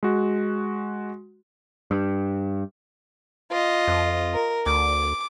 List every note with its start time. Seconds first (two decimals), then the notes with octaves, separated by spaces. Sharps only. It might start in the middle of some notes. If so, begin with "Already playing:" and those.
0.03 G#3 F#4
1.91 G2
3.50 F4 D#5
3.88 F2
4.34 A#4
4.66 D2 D6